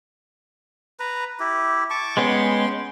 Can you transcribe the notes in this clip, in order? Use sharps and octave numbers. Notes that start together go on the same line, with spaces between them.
B4 A#5
E4 G4
A5 C#6 D6
G#3 B3 C#4 G5 C6